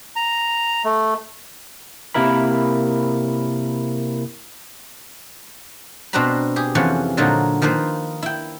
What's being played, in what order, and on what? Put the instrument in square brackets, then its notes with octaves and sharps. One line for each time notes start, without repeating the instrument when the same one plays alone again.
[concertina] A#5
A3
[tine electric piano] C3 A#3 E4 A#4 B5
[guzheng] B2 C4 D4 B4 A#5 B5
G4 G#4
F2 C3 E3 F3 C#4 F#5
A#2 D3 F3 F#3 D#4
D#3 F3 A#3 B4 C5
E4 G5